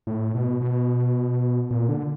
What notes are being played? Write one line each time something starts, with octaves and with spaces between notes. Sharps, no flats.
A2
B2
B2
A#2
D3